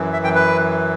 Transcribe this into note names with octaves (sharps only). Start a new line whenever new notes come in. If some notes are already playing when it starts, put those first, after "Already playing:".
Already playing: F#2 E3
E5
G5
B4